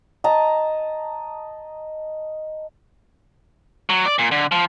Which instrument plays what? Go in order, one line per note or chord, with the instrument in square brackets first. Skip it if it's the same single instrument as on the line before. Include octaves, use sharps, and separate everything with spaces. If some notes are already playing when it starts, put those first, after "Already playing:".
[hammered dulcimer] D#5 A5 A#5
[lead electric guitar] F#3
D5
A#2
D3
F3